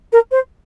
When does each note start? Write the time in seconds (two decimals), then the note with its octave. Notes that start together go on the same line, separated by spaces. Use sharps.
0.12 A#4
0.31 C5